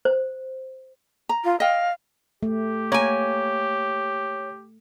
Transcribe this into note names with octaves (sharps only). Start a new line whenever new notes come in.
C5
A#5
F4
D#5 F5 G5
A3 G4
A#3 C#5 G#5